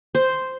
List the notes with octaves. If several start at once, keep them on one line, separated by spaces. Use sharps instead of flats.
C5